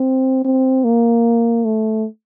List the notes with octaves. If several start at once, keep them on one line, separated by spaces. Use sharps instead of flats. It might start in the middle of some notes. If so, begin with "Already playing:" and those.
Already playing: C4
C4
A#3
A3